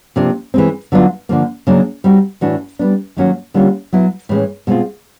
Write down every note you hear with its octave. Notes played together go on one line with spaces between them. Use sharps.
C3 F3 A#3 D4
E3 G#3 C4
D3 F#3 B3 D4 F4
D3 F3 A#3
C#3 F#3 A#3 D4
G3 C4 D#4 F#4
A2 E3 A3 D4 F#4
G3 B3 D4
D#3 F#3 A#3 C#4 F#4
D3 G3 A#3 C#4 F4
F#3 B3 E4
A2 E3 G#3 C#4
B2 G#3 C4 F4